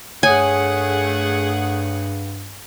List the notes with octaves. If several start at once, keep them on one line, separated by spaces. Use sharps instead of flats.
G2 A3 G#4 C#5 F#5 G#5 D#6